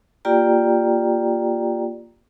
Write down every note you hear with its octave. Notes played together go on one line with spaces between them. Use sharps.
A#3 F4 G4 D5 G5 A#5